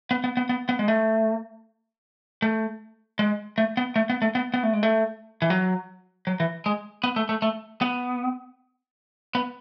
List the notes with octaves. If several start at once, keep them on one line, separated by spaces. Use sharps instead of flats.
B3
B3
B3
B3
B3
G#3
A3
A3
G#3
A3
B3
A3
B3
A3
B3
B3
A3
G#3
A3
E3
F#3
F#3
E3
G#3
B3
A3
A3
A3
B3
B3